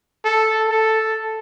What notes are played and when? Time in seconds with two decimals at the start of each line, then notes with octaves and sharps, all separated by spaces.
0.25 A4
0.69 A4